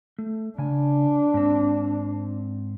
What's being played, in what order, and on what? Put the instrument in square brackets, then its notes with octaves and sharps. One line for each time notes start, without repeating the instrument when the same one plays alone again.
[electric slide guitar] A3
[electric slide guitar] C#3 G#5 [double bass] D4
[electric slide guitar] G#2 C4